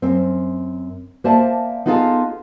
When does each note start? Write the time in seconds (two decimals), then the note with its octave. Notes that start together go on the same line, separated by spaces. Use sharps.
0.02 F#2 C4
1.24 A#3 C5 D5 E5 G#5 A5
1.86 B3 D#4 F4 G#4 A4 F5